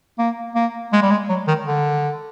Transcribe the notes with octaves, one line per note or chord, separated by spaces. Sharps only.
A#3
A#3
G#3
G3
G#3
F#3
D#3
D3